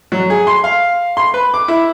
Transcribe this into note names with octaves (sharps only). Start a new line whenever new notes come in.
F#3
G#4
C6
F5
C6
B4
D6
E4